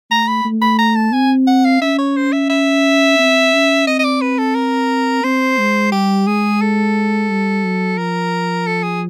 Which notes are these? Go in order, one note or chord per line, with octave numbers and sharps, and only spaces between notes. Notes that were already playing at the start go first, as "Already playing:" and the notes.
A3 A#5
B5
A3
B5
A#5
A5
C4 G#5
F#5
F5
C#4 E5
C#5
C5
E5
E5
C4
C#4
C4 D#5
D#5
D5
B4
A4
A#4
C4 C5
G#3
G3 G4
G#3 G#4
A4
G3
F#3
F3 A#4
A4
G#4